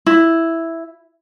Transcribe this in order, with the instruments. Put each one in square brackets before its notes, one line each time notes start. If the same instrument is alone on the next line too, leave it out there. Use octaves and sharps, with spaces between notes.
[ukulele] E4